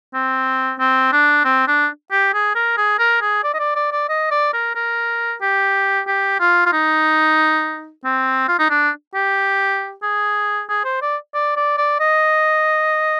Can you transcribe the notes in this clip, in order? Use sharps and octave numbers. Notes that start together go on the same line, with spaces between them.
C4
C4
D4
C4
D4
G4
G#4
A#4
G#4
A#4
G#4
D5
D#5
D5
D5
D5
D#5
D5
A#4
A#4
G4
G4
F4
F4
D#4
C4
F4
D#4
D4
G4
G#4
G#4
C5
D5
D5
D5
D5
D#5